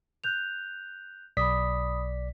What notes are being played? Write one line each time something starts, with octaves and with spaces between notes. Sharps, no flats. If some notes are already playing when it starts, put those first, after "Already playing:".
F#6 G6 F7
B1 D5 B5 D#6 B6